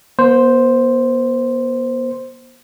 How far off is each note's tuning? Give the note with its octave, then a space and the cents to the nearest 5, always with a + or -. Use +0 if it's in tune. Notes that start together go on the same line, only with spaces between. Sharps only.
B3 -45 C5 +0